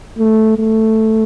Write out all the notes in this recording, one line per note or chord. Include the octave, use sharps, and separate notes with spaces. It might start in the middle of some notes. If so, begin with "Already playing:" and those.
A3
A3